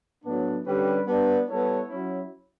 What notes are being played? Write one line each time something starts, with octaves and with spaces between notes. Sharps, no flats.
A2 F#3 B3 D4
D3 G3 C#4 G4 B4
G3 B3 D4
G3 B3 E4 A4 C#5
F#3 C#4 E4